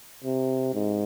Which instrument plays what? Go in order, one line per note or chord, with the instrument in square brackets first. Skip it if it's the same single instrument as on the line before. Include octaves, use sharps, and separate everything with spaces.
[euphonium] C3
G#2